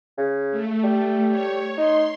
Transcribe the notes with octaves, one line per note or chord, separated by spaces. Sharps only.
C#3
A3
G3
C#5
D#4 C6